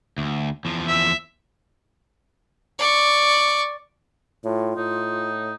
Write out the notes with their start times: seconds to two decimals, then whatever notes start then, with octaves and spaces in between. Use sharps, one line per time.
0.18 D2
0.65 E2 F3
0.88 E5
2.79 D5 C#6
4.45 A2 F4
4.77 A2 D#4